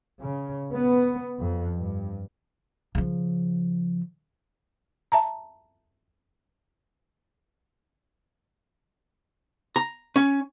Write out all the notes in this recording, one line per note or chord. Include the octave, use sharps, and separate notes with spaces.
C#3
B3
F2
G2
C#3 F3
E5 A5 A#5
A#5
C#4